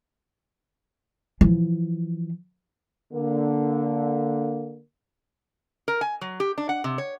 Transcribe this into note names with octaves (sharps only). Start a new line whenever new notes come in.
E3 F3
D3 A#3
A#4
G#5
F#3
G4
D4
F#5
C3
C#5